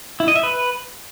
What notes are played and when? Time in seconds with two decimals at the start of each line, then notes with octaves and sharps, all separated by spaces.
0.20 E4
0.28 D#5
0.36 E5
0.43 B4